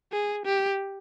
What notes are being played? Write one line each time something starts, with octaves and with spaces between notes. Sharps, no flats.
G#4
G4